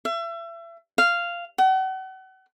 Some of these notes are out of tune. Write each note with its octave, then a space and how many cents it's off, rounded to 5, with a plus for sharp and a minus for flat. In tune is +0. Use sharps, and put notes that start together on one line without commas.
E5 +35
F5 -10
F#5 +40